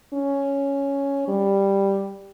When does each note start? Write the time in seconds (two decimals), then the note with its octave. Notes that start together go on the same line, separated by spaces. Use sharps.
0.13 C#4
1.28 G3